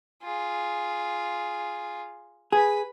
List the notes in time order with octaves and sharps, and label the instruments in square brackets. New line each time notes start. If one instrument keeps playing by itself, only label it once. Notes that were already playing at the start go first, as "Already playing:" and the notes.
[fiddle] F4 G#4
[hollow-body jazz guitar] G#4 [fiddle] B4 B5